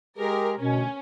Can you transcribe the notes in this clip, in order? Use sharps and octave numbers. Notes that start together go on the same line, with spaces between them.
G#3 G4 G#4 A#4
D2 B2 C#4